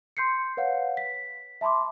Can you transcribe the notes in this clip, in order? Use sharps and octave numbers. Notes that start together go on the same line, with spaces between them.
C6 G6 C7 C#7
B4 C#5 F5 F#5
B6
E5 A5 B5 C6 D6